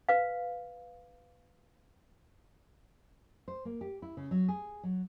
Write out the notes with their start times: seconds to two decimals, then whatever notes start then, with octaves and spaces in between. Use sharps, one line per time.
0.09 B4 F5
3.48 C5
3.65 A#3
3.81 G4
4.02 E4
4.17 C#3
4.31 F#3
4.48 G#4
4.83 F#3